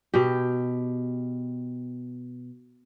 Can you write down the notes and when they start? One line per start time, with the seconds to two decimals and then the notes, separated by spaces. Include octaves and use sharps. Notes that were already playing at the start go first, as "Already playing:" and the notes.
0.14 B2 G4